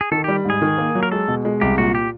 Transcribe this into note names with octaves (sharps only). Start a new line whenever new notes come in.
G#4
D#3 A4
G3 G4
G#2 G#4
D#3
A#3
F#3
A#4
G#3 A4
B2
G#3
C2 G4
A#2 F#4
G4